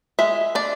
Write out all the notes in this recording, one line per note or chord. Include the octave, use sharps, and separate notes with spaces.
G#3 E5
D4 D5